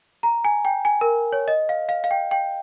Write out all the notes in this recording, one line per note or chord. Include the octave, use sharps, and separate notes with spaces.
A#5
G#5
G5
G#5
A#4
C#5
D#5
F5
F5
F5
G5
G5